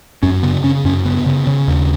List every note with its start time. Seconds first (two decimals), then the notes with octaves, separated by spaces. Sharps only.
0.23 F#2 C#4
0.43 C#3 B3
0.64 C#3 C#4
0.85 F#2 C#4
1.05 C#3 B3
1.26 C#3
1.47 C#3
1.68 D#2